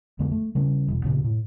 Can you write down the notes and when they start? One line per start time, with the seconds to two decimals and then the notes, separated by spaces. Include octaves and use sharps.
0.19 F2 D3 G#3 B3
0.32 A3
0.55 C#3 G3 C#4
0.88 E1
1.04 D2 A#2 C#3
1.24 A2